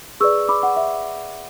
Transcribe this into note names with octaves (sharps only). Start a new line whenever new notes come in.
G#4 B4 D5 C#6 E6
B5 D6
F#5
E5